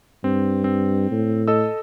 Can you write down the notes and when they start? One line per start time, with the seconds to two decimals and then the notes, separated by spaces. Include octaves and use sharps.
0.24 G2 C4
0.64 C4
1.11 A2
1.48 A4 D#5 E6